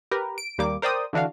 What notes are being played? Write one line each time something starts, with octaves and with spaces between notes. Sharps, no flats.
G4 A#4 B4
D7
D#2 G3 A#3 D6
A#4 C5 D5 G5 D#6
D3 E3 D4 F#4 F5